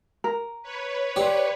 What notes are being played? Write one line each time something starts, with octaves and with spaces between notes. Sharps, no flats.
A#4
B4 C#5
G4 C5 D5